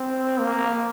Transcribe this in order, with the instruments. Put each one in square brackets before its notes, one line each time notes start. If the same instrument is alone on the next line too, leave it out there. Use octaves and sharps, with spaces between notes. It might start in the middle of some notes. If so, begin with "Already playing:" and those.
Already playing: [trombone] C4
A#3